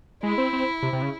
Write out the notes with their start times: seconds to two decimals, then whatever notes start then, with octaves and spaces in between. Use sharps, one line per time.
0.23 G#3 E4
0.38 C4
0.53 C4
0.83 C3
0.93 C3
1.02 C#3